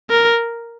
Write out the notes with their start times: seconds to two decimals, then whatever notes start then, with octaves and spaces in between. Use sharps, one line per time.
0.10 A#4